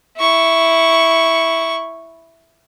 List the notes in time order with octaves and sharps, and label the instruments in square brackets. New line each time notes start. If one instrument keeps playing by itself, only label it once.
[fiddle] E4 C#6